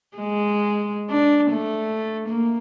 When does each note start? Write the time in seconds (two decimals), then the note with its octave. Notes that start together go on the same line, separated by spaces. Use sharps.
0.17 G#3
1.10 D4
1.51 A3
2.28 A#3